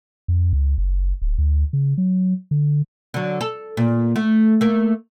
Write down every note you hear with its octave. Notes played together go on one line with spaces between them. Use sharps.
F2
C#2
F#1
D1
D2
C#3
F#3
D3
D3 F#3
A4
A#2
A3
A3 A#3